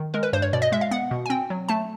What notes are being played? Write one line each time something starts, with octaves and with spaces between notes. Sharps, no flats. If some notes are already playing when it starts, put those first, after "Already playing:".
Already playing: D#3
G#3 A#4
B4
G2 C5
C#5
B2 D5
D#5
G#3 E5
F5
B3 F#5
B2
G#5
C4 G5
F#3
A3 A5